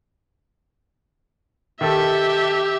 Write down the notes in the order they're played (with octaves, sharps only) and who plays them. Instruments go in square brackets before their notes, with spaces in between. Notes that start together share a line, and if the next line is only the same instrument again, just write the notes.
[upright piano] D#3 A4 [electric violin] G4 E5